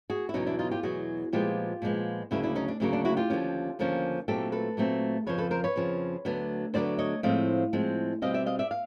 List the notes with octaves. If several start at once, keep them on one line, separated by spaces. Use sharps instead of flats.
F#4 G#4
E4
E2 B2 F#3 C#4 D#4
D4 E4
D#4 F4
F4 G4
E2 B2 F#3 F#4 G#4
A#2 F3 G#3 B3 F4 G4
A#2 F3 G#3 B3
D2 C#3 F#3 A#3 E4 F#4
D4 E4
C#4 D#4
D4
D2 C#3 F#3 A#3 C#4
D4
E4 F#4
F4 G4
D#2 D3 F3 A#3 C#4
D#2 D3 F3 A#3 C#4
A#2 F#3 A3 C4 G4 A4
A4 B4
A#2 F#3 A3 C4
F2 C#3 F3 B4 C#5
A4 B4
A#4 C5
B4 C#5
F2 C#3 F3
D2 D3 F#3 B3
D2 D3 F#3 B3 C5 D5
C#5 D#5
A2 F3 G#3 C4 D#5 F5
A2 F3 G#3 C4
B2 G3 C4 D#5 F5
D5 E5
D#5 F5
D5 E5
F5